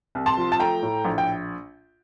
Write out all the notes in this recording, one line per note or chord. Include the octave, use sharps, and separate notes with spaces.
C2
A5 C6
F3
A5
A3 G5 A#5
A2
A#1
G5